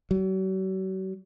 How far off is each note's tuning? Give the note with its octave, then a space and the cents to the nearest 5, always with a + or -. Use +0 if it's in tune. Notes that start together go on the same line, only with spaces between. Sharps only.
F#3 +40